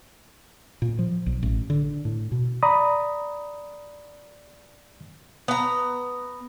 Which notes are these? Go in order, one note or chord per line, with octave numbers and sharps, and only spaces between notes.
A#2
F3
B1
A1
D3
A2
B2
D5 A#5 B5 D#6
B3 A#5